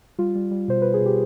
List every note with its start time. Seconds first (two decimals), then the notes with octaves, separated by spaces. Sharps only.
0.19 G3 F4
0.35 G3
0.51 G3
0.68 B2 C5
0.82 B2 B4
0.94 G#4
1.01 B2 G4